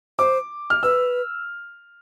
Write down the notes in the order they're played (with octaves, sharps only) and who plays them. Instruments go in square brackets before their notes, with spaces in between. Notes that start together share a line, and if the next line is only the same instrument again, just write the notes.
[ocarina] C5 [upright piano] D6
[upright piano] F6
[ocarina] B4 [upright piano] E6